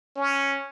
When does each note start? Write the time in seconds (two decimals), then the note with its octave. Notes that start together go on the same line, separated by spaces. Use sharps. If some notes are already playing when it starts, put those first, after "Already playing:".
0.16 C#4